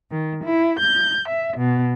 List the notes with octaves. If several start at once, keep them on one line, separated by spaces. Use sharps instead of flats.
D#3
E4
G6
E5
B2